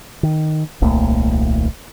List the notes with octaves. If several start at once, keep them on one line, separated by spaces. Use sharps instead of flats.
D#3
D#1 C2 A3 A#3